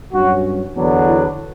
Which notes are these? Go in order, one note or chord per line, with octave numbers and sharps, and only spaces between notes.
G2 F#3 C#4 F#4
E2 D3 F#3 B3 D4
E4